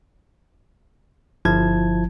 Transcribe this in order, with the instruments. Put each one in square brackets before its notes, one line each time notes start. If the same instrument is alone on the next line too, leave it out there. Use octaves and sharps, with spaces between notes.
[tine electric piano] G1 F3 E4 A5 G#6